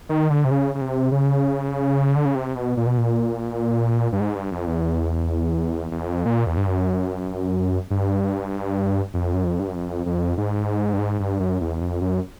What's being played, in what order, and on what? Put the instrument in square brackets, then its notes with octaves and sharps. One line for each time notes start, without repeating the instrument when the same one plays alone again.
[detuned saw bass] D#3
D3
C3
C#3
C#3
C3
C#3
D3
C#3
C3
B2
A#2
B2
A#2
G2
G#2
G2
F2
E2
E2
F2
A#2
E2
G2
F#2
G2
F2
F#2
F2
G2
F#2
F2
F2
G#2
G2
G#2
G2
F#2
E2
F2
F#2